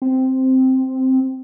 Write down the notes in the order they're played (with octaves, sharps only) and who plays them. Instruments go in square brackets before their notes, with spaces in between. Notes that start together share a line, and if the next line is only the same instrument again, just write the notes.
[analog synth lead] C4